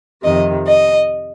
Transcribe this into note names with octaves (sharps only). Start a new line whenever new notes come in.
F2 C3 D#3 D#5
D#5